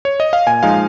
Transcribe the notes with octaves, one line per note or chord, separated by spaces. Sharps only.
C#5
D#5
F5
A#2 G#5
F3 G#3 D#4 F5